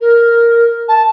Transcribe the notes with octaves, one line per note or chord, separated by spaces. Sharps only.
A#4
A5